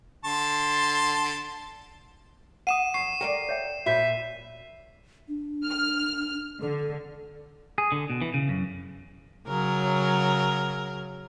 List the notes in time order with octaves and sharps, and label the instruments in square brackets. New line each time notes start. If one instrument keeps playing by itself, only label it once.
[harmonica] D3 A5 [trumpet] C6
[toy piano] F#5 A#5 D#6 [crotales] D#7 E7
[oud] E2 [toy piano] C#6 [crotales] C7
[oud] A#4 C5 D5 [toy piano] G5
[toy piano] C#5 E5 G5
[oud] A#2 [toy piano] F#4 C#5 B5 [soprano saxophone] E5
[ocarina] D4
[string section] F6
[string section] D3 [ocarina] A4
[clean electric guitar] G#4
D3
B2
E3
C#3
F#2
[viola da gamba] C#3 F#3 A#4